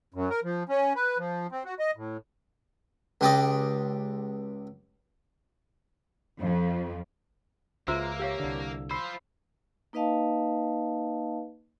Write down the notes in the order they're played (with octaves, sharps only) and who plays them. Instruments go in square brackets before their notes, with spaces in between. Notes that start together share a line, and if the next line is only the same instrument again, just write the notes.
[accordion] F#2
A#4
F3
C#4
B4
F3
C4
F#4
D#5
A2
[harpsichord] C#2 G4 D5 D#5
[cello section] F2
[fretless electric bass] C#2 [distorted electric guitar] A#3 [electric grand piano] F4 A#5 E6 [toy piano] F#4 C5 E5
[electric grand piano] G4 C#5 [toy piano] A#4 F5
[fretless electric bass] C2 D3
[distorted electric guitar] F4 C5 [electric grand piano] B5 C7 [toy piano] E6
[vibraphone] A#3 D#4 B4 D#5 F5 A5